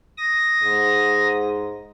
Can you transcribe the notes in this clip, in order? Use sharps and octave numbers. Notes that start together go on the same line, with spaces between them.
D#6 A#6
G#2